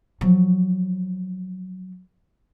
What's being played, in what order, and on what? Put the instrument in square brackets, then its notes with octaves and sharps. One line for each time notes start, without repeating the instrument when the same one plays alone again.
[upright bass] F3 F#3